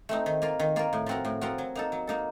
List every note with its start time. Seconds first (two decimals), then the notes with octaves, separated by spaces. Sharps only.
0.09 A3 C4 D#4
0.26 D#3
0.42 A#3 F4 A#4
0.59 D#3
0.76 A#3 F4 A#4
0.93 A2
1.06 F3 C4 F#4 A#4
1.25 A2
1.41 F3 C4 F#4 A#4
1.58 F#3
1.75 A#3 D#4 A4
1.92 F#3
2.07 A#3 D#4 A4